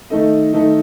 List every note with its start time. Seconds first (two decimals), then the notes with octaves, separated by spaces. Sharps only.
0.10 D#3 A3 D#4 A4 D#5
0.53 D#3 A3 D#4 A4 D#5